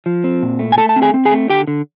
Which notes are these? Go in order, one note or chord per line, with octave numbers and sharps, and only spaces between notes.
F3
C4
A#2
A3
G#5
A3 A4 A5
A5
C4
G#4 G#5
C4
G#4 G#5
A3
D3 G4 G5
D3